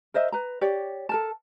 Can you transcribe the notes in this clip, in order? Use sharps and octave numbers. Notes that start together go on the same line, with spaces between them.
A#4 C5 D#5 E5
B4 A#5
G4 C#5 D5
A4 A#4 A5